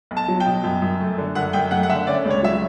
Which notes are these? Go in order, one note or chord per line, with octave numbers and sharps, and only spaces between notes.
B1
A5
F#3
G5
B2
F#2
F#2
A3
D3
F#2 F#5
F#2 G5
A3 F#5
F#5
D3 E5
C#4 D5
C#2
C#5
F#3 E5